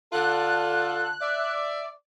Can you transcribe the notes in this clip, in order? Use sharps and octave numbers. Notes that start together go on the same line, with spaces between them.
D3 F4 A4 F#6
D5 E5